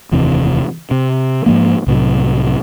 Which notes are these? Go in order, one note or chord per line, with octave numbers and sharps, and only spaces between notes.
F1 D#2 C3 E3
C3
G#2 F3 A#3
C2 A2 C3 F#3